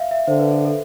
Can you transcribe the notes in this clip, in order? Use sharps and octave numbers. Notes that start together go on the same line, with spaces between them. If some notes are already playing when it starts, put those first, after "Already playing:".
Already playing: E5 F5
E5
D3 C5
B4
A4
A4